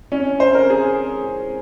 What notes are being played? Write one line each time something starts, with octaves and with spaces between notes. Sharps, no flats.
C#4
C5
A#4
G#4